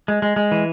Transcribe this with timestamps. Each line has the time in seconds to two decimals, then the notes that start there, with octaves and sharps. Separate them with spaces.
0.08 G#3
0.22 G#3
0.36 G#3
0.51 E3